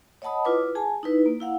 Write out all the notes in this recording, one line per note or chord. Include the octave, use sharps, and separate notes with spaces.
C#5 D#5 F#5 A5 B5 D#6
E4 F4 B4 D6
G#4 G#5 A5
D#4 E4 B4
A#3
E4 F5 F#5